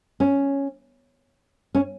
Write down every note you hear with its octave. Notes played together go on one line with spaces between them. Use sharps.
C#4
C#4